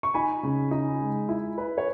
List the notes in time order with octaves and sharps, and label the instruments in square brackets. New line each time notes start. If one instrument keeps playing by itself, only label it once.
[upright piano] C#6
[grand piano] D#4 [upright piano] G#5 B5
[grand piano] C#3
D#4
G#3
E4
B4
[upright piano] C#5